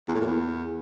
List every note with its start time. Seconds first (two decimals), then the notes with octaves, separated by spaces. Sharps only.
0.08 E2
0.14 A2
0.20 A#2
0.26 E2